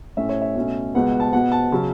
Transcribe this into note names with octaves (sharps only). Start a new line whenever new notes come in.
A2 A3 C#4 E5
C#5
E5
B2 A3 C#4
C#2 B2 B3 F#5
A5
B2 B3 F#5
A5
C#3 F#3 C#4